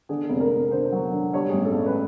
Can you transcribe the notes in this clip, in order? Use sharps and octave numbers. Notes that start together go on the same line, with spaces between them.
D3 G#4
F1 A4
A#4
F1
D3 C5
F#3
D3
G2 C#5
A1 G#4
A4
A1
B4